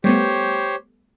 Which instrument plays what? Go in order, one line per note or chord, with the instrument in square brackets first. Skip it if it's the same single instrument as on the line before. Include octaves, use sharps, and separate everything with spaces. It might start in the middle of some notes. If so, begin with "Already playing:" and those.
[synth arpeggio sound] G3 A3 B3 [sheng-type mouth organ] G4 C5 C#5